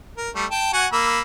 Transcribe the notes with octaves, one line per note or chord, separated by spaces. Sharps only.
A#4
G3 A3
G5 A5
F#4 F#5 G#5
A#3 B5 E6